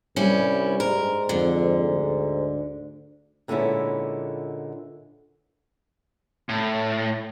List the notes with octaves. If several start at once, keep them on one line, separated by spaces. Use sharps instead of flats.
C2 G2 G3 C#4 E4
G#2 A#4
F2 D3
D2
A#2 D3 G#3 B3 C#4 E4
A2